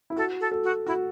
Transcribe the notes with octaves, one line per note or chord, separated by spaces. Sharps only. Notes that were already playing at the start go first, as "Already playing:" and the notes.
E4
F#4 A4
A4
A4
F#4
E4 F#4